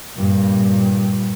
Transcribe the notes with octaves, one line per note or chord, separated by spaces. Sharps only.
G2 A#2